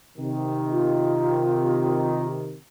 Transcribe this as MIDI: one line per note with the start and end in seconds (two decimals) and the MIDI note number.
0.18 2.56 48
0.18 2.56 51
0.72 2.26 65